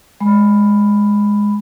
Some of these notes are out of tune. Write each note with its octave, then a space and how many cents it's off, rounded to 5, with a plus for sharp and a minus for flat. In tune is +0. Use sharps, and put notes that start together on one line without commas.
G#3 -5 B5 +5